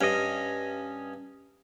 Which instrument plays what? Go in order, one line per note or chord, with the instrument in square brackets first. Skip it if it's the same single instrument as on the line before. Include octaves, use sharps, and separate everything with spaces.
[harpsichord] G2 [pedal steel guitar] C#4 D#5